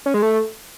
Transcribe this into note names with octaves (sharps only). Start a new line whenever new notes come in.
C#4
G#3
A3